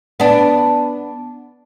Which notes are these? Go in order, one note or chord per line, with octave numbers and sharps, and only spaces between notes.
B3 D4